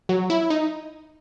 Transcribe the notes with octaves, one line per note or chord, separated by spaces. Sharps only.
F#3
E4
D#4